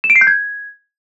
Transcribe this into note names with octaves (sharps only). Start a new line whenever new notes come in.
E7
D7
C7
G6
G#6